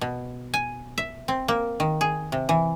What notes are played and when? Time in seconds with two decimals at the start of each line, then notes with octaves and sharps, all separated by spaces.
0.01 B2
0.54 G#5
0.98 E5
1.28 C4
1.48 A#3
1.80 D#3
2.01 G#4
2.32 C3
2.49 E3